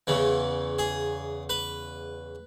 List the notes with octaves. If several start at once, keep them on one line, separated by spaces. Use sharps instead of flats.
E2 C#3 E3
G#4
B4